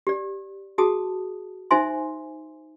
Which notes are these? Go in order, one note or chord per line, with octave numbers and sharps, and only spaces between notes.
G4 D5
F#4 G#4 A5 D#6
D#4 C5 E5 G#5 C6